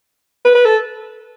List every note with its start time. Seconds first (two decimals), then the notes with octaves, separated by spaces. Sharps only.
0.45 B4
0.55 B4
0.65 A4